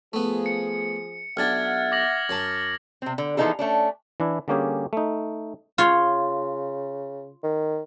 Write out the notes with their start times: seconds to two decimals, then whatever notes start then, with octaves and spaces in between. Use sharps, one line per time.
0.13 F3 A3 B3 G#4
0.46 C#7
1.37 B1 D4 G4 E5 F#5 F6 G#6 A6
1.92 D6 A#6 F#7
2.29 F#2 F#3 A5
3.02 C3 C4
3.18 D3
3.37 E3 F3 B3 D#4 G#4 A4
3.59 A3 C#4 D4
4.20 E3 D4 E4
4.48 D3 G3 A#3 C#4 G4 G#4
4.93 A3 D#4
5.78 C#3 F4 C#5
7.43 D#3